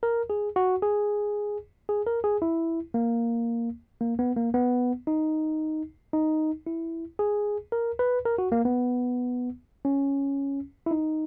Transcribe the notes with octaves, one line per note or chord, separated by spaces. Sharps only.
A#4
G#4
F#4
G#4
G#4
A#4
G#4
E4
A#3
A#3
B3
A#3
B3
D#4
D#4
E4
G#4
A#4
B4
A#4
F#4
A#3
B3
C#4
E4
D#4